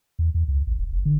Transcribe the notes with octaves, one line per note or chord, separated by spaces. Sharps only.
E2
E2
C#2
A1
E1
F#1
D3